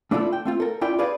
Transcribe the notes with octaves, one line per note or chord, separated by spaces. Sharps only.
A3 D4 E4 F4 G#4 A4
G5
A3 C4 F4
A4 A#4
C#4 E4 F4 D5 E5 G5
D4 G4 G#4 B4 D5 F5